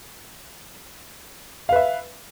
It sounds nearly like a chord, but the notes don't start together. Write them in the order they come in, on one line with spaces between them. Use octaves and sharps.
F5 B4 E5